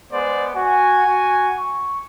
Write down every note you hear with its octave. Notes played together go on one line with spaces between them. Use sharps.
G#3 B3 C5 D5
F#4 G#5
F#4
C#6